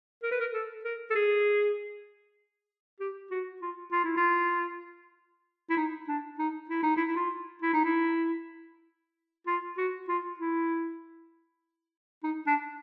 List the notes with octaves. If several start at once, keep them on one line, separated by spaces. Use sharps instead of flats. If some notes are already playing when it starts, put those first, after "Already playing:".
A#4
B4
A#4
A4
A#4
A4
G#4
G4
F#4
F4
F4
E4
F4
E4
D#4
D4
D#4
E4
D#4
E4
E4
F4
E4
D#4
E4
F4
F#4
F4
E4
D#4
D4